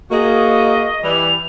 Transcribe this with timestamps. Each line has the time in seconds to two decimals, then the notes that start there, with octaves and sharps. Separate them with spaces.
0.11 A#3 F#4 G#4 D#5
1.04 E3 G3 F7